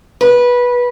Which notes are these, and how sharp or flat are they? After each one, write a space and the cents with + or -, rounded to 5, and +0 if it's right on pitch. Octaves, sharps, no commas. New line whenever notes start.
B4 -15